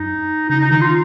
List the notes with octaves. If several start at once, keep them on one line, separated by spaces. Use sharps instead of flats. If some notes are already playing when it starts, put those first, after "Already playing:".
Already playing: F#2 D#4
C#3 D#4
D#4
D#3 D#4
F4